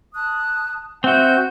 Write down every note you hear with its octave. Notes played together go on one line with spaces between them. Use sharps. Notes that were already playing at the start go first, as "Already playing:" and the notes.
A5 D#6 F#6
C4 F#4 E5 F#5 G6